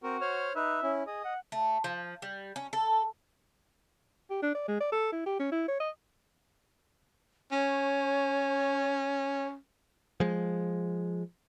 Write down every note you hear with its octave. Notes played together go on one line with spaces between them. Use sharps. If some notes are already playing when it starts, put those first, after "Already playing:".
C4 F#4 A#4
C5 C#5 F6
D#4 B4 E5
C#4 E4
G#4 D#5
F#5
A3
F3
G3
C#4
A4
G4
D4
D5
G#3
D5
A4
E4
G4
C#4
E4
C#5
D#5
C#4 C#5
F3 G#3